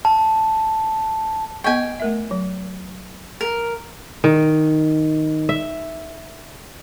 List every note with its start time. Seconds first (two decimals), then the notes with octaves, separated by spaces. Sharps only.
0.05 A5
1.64 B3 D#5 G5 G#5 C#6
2.00 A3 A#4 E5
2.31 F#3
3.41 A#4
4.24 D#3
5.49 E5